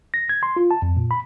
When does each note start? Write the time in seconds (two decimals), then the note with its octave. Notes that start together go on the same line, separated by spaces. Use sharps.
0.14 A#6
0.29 G#6
0.43 C6
0.56 F4
0.71 A5
0.82 F2
0.97 A#2
1.11 B5